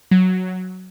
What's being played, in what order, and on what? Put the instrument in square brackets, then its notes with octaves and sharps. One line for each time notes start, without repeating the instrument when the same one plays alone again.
[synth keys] F#3